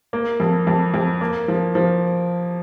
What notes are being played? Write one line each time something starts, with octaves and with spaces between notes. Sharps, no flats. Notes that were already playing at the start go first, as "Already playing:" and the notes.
A#3
F2
F2
F2
A#3
F3
F3